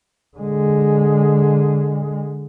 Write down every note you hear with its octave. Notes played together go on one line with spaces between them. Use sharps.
D3 G#3